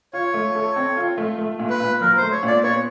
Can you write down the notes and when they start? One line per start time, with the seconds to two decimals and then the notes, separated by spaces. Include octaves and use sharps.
0.13 F4 C#5
0.34 A3
0.55 A4
0.76 C4
0.97 F4
1.18 A3
1.38 A3
1.59 A#2
1.70 B4
1.80 A#2
2.01 F#3 A#4
2.17 C5
2.22 A3
2.32 C#5
2.43 A#2 D5
2.63 B3 C#5